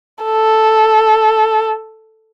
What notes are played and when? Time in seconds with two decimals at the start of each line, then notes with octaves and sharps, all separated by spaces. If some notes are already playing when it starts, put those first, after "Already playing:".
0.24 A4